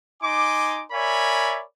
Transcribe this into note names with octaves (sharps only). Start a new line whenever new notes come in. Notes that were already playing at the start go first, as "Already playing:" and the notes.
D#4 G#5 C6 D6
A#4 C#5 D5 E5 G#5 B5